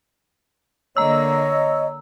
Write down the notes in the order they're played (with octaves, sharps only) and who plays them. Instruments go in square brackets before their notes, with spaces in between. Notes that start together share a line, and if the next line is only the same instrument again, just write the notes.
[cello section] D3 A#3 [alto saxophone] C#5 [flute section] D#5 [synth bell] A#5 E6